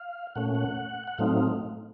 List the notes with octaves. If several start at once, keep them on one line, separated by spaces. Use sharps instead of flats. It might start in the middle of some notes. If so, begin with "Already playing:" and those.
Already playing: F5
A#2 A3 C#4 F#5
F#5
F#5
A2 F#3 A3 C4 D#4 F5